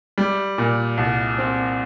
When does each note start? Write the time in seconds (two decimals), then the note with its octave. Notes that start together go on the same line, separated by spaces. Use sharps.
0.18 G3
0.58 A#2
0.98 C2
1.38 C4